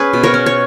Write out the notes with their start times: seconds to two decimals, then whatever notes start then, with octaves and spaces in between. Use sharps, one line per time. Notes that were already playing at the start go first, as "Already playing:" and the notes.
Already playing: C#4 G#4 B4
0.13 B2
0.24 A#4 C#5
0.34 C#4
0.46 C#5